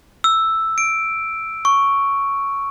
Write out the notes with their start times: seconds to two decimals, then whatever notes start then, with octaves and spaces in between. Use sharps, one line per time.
0.24 E6
0.78 D7
1.65 C#6